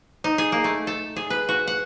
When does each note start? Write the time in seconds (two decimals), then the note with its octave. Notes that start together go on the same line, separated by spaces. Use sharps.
0.24 D#4
0.38 G#4
0.52 A#3
0.64 A3
0.87 A4
1.16 G#4
1.30 B4
1.49 F#4
1.67 F#5